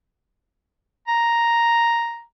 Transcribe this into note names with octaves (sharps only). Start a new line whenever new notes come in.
A#5